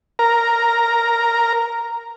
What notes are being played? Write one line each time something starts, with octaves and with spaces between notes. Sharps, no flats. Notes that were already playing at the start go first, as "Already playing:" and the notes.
A#4 A#5